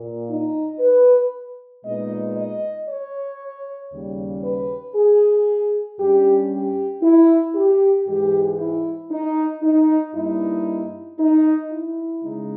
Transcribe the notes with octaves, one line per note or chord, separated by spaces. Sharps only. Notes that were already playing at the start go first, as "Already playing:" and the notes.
Already playing: A#2 A#3
D#4
B4
A#2 G#3 B3 D#4 D#5
D#5
C#5
D#2 C#3 G3
B4
G#4
G2 G3 C#4 G4
G4
E4
G4
G#2 E3 G#3 G4
E4
D#4
D#4
G2 G3 A#3 D#4 E4
D#4
E4
C#3 G#3 D#4